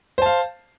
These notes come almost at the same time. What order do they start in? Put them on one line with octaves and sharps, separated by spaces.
C5 A5 F5